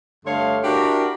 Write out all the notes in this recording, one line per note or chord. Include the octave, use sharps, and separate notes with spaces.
G2 D3 A3 C#5 F5 C6
D4 E4 F#4 G4 A#4